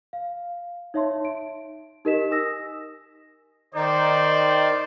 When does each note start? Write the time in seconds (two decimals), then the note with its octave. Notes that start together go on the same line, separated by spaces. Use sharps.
0.13 F5
0.94 D#4 C#5 E5 A5 C6
1.25 D7
2.05 D#4 G4 A#4 D#5 B6 E7
2.31 G#5 D#6 E6 A#6
3.75 D#3 D#4 C5 D5